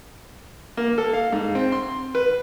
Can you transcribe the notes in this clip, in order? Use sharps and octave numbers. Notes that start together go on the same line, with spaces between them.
A#3
A4
F5
G#2
C4
C6
B4